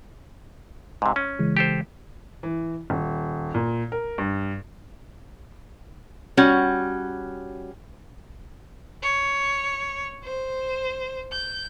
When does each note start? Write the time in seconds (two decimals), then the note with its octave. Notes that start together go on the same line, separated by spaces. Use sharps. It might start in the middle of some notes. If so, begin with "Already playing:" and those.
1.02 G#2 C3
1.16 C#4
1.39 C#3 E3 G#3
1.57 G4 A4 C5
2.43 E3
2.90 D#1
3.55 A#2
3.92 A#4
4.18 G2
6.37 G3 C#4 F#4
9.02 C#5
10.23 C5
11.32 G6